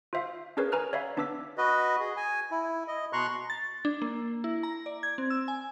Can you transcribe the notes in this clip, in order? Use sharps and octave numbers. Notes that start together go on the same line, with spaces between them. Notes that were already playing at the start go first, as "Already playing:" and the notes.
F4 C5 E5 F5
C#4 D4 G#4 A#4 B4 C#5
B4 G#5 A#5 F6 F#6
C#5 D5 E5 F5 B5
B3 D4 B4 D6 E6 B6
F#4 B4 D#5
G#4
G#5
E4
D#5
B2 A#5 C6 C#6 F#6
A6
D4
A#3
E4
A#5
D5
G#6
C4
E6
G#5